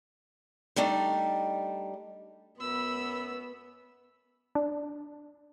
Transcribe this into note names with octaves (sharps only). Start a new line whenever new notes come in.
G3 A3 D4 D#4
F#2 B3 B5 E6
D4